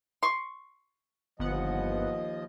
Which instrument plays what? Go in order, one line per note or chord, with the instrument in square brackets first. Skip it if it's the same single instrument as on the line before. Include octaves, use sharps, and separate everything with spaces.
[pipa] C6 C#6
[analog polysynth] G1 B3 F#5 [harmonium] D#2 F3 D#5